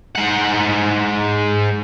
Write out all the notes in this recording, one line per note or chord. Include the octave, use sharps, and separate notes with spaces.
G#2 F#5